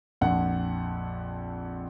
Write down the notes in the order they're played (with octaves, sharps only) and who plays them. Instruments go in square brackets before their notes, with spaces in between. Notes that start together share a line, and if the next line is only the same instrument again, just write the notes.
[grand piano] A#1 F2 F#5